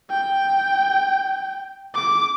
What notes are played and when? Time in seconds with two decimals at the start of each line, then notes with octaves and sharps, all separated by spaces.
0.10 G5
1.95 D6